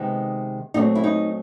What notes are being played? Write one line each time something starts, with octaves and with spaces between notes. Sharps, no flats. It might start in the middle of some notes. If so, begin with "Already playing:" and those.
Already playing: C3 D#3 G#3 B3 D#4
A#2 F#3 A3 C4 D#4
E4
D#4